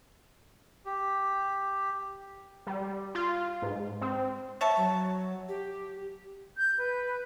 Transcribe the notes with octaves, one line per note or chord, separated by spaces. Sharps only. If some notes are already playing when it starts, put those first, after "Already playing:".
G4
G3
F4
G#2
C4
C#5 E5 A5
F#3
G4
G6
B4